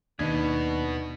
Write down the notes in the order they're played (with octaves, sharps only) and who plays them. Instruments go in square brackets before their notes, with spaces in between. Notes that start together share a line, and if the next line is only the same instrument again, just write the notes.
[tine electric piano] D#2 G#6 [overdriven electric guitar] B2 B3 [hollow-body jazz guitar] D4 D#4